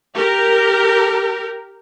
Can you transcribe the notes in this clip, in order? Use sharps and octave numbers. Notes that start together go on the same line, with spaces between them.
G4 A#4